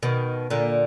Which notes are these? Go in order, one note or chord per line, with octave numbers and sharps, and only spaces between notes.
B2 D#3
A#2 D3